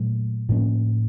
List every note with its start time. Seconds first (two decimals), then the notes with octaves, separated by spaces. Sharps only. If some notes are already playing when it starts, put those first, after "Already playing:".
Already playing: A#2 F#3 A3
0.49 A2 F3 A#3 C#4